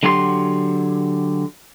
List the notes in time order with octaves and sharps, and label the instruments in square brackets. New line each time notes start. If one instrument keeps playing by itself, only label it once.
[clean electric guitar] D3 F#3 F#4 G4 B4 C6